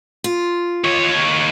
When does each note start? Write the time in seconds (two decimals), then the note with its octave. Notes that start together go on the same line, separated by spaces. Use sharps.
0.24 F4
0.84 D#2 C#5